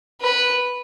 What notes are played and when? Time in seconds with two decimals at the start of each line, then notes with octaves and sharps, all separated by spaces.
0.21 B4